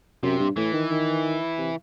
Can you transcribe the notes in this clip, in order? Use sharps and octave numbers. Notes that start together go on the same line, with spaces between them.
F#2 C3
G2
A2 E3
D#3
D#3
C3